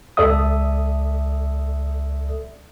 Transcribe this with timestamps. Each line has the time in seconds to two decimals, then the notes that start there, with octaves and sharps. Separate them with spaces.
0.17 C#2 A4 D5 E5 D#6